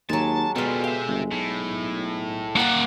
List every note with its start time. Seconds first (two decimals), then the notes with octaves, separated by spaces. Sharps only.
0.09 D#2 F#3 G#3 A5
0.56 B2 G3 G#3 F4 A4
0.84 G4 E5 F5
1.07 G1
1.31 B1 A2
2.56 A#3 D5 F#5 G5